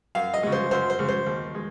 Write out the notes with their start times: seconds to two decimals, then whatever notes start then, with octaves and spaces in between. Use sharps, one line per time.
0.15 F#2 F5
0.34 D#5
0.43 C#3 G#3
0.52 C5
0.71 F#2 C5
0.90 C5
0.99 C#3 G#3
1.09 C5
1.26 D#2
1.54 G#3